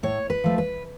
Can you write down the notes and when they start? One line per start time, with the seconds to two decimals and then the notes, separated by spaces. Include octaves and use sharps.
0.03 A2 C#5
0.30 B4
0.44 F3 A3
0.58 B4